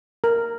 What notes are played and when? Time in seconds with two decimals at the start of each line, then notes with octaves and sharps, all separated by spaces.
0.24 A#4